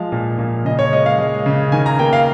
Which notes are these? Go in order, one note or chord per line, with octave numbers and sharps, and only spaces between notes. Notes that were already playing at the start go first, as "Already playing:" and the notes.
Already playing: F3 G#3 F5
A#2
A#2
C#3 D#5
C#5
G#3 D#5
F5
G#3
C#3
D#3 G#5
A#5
A#3 G5
F5